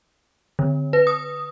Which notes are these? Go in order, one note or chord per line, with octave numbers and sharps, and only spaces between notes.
D3
B4
D#6